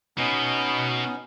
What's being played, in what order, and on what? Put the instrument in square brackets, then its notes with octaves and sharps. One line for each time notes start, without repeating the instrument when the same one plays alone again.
[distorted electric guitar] B2 [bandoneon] B3 C#4 D#4